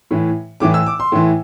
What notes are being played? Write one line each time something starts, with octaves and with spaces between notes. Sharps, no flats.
A2 E3
A2 E3 D6
E6
D6
C6
A2 E3